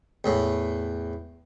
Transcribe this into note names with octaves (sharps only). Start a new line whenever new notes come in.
E2 A2